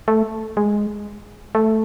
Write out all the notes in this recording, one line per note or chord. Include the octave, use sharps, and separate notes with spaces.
A3
G#3
A3